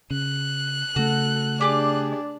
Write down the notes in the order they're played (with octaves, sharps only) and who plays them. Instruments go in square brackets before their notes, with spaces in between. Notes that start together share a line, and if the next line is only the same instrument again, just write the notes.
[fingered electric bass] C#3 [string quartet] F#6
[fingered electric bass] C#3 A3 [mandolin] F#4 [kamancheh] A4
[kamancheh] D4 D5 [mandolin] G4 G#4 D6